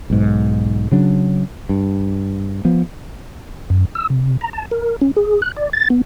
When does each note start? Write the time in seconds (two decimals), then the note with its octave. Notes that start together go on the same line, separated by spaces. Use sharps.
0.10 B1 G#2
0.92 C#3 F#3 D4
1.69 G2
2.65 F3 B3
3.70 F#2
3.95 E6
4.10 C3
4.41 A#5
4.53 A5
4.71 A#4
5.01 C#4
5.16 G#4
5.42 F#6
5.57 D5
5.73 A6
5.90 B3